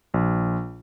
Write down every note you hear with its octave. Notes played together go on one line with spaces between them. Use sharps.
A#1